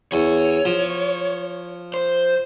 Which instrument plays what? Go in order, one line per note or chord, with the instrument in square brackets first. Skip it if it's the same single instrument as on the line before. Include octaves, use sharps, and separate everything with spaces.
[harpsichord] E2 [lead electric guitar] C#5
[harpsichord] F3
[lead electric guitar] C5